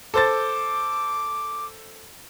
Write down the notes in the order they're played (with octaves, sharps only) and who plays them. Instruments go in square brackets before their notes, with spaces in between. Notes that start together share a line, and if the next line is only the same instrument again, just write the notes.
[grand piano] A4 C5 A6 [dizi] D6